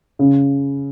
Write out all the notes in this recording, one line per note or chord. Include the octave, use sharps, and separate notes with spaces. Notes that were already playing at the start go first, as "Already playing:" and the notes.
C#3